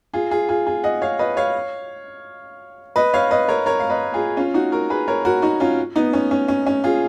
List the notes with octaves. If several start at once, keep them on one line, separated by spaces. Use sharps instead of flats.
F4 G#4
F4 G#4
F4 G#4
F4 G#4
D#5 F#5
C#5 F5
B4 D#5
C#5 F5
B4 D#5
C#5 F5
B4 D#5
A#4 C#5
A#4 C#5
F5
B4 D#5
F4 G#4
C#4 F4
D#4 F#4
F#4 A#4
G#4 B4
A#4 C#5
F#4 A#4
D#4 F#4
C#4 F4
B3 D#4
C#4
C#4
C#4
C#4
F4 G#4